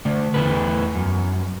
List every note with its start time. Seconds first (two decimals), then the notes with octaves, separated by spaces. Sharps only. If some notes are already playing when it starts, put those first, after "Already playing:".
0.05 D3 A3
0.34 E2 C3 E3 A3 B4
0.95 F#2